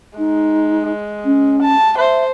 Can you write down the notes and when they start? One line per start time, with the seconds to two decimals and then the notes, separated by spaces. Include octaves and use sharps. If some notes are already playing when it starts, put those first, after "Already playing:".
0.18 G#3 D#4
1.25 C#4
1.62 A5
1.98 C5 E5